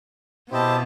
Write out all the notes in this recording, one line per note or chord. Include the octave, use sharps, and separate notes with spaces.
B2 C4 E4 G4 D#5 A5